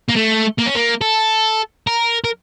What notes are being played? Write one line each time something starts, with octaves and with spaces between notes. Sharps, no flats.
A#3
A3
A#3
C#4
A#3
A4
A#4
A#4